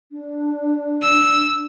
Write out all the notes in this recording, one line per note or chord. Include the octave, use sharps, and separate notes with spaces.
D4
E6